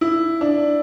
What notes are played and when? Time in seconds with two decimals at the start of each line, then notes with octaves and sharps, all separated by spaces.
0.01 E4
0.41 D4